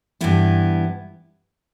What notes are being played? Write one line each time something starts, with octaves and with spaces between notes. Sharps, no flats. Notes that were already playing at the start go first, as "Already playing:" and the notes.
G2 E3 B3 E4